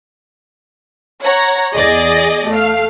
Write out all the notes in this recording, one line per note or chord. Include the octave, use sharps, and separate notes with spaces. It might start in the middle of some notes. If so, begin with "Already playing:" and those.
C#5 F#5 A#5
E2 G#4 D5 D#5 A#6
A3 F5